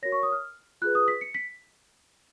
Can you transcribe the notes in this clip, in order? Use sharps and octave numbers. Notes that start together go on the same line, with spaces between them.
F#4 A#4 C#5 A#6
C#6
D#6
F6
F4 G#4 B4 F#6
D#6
B6
C#7
B6